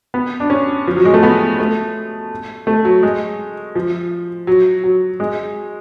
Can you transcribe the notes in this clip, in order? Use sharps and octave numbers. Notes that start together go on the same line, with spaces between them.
B3
D4
C#4
F3
F#3
G#3
A3
B3
A3
A3
F#3
G#3
F3
F#3
F#3
G#3